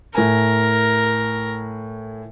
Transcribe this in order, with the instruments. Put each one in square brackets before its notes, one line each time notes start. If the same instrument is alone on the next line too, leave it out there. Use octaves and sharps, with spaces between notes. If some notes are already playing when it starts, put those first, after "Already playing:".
[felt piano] A2 G#5 [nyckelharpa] A#4